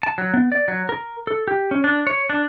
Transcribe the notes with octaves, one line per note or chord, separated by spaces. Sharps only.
A5
F#3
B3
D5
F#3
A#4
A4
G4
C#4
D4
C#5
D4